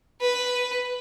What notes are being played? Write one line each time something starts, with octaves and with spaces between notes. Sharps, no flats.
B4